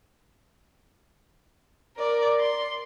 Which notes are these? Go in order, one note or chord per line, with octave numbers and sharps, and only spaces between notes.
A#4 D5
C6